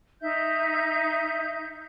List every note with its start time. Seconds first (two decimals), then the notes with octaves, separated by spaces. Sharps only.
0.22 D#4 E5 G6